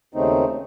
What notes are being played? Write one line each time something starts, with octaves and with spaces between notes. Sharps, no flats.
D#2 C#3 A3 C4 D#4